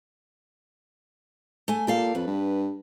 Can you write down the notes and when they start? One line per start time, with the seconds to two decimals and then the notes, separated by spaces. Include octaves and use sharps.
1.68 A3 G#5
1.87 A#2 G4 A4 F5
2.15 F2 B4
2.27 G2